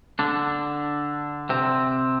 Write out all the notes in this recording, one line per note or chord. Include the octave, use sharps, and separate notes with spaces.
D3 D4
C3 C4